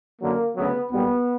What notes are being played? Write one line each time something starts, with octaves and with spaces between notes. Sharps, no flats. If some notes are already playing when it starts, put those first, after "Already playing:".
F#2 D3 F#3 A#3
D2 C#3 F#3 B3
B1 A#2 G3 B3